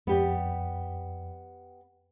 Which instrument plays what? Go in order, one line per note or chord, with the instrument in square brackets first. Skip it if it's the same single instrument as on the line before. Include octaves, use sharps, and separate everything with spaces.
[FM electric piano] F2 [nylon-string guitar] B3 G4 D5